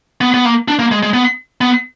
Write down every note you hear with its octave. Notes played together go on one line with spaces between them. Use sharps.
B3
B3
A#3
D4
A#3
G#3
G#3
B3
B3